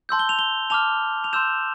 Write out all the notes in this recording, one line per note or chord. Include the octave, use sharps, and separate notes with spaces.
A5 C6 E6 G6
G7
F7
G7
A5 D6 F6 F7
F7
C6 E6 G6 E7